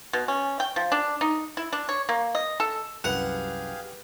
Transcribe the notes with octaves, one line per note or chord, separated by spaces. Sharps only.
B2
C#4
G5
F3
D4
D#4
E4
D4
C#5
A#3
D#5
A4
C2 F#2 G4 G#4 B4 F5 F#5 F7